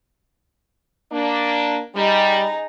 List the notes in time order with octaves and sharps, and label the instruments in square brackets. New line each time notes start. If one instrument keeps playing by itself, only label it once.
[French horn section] A#3 D4
[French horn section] G3 [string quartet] D#4 G#4